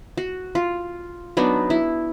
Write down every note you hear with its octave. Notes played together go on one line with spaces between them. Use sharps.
F#4
F4
F#3 B3 D4 D#4
E4